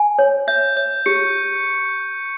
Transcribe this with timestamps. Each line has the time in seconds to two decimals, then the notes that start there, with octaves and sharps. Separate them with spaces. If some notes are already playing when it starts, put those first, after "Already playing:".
Already playing: G#5
0.19 C#5
0.48 E5 G6
0.77 C#5 G6
1.06 G4 C#6 C#7